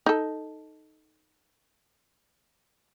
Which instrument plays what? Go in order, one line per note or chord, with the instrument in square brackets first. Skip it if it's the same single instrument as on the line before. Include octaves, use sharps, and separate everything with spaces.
[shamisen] D#4 A4